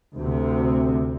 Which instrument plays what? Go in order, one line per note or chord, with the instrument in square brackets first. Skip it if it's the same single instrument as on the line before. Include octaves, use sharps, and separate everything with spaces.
[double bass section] D2 C3